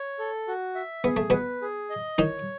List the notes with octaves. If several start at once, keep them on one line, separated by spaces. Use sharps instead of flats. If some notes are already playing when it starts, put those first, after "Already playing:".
Already playing: C#5
A4
F#4
E5
B3 G#4
A3
B2 B3 B4
G#4
D#5
D#3 D#4 C#5